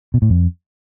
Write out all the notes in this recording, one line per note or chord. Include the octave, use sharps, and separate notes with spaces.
B2
A2
F2